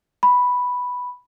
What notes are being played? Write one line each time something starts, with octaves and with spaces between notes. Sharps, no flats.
B5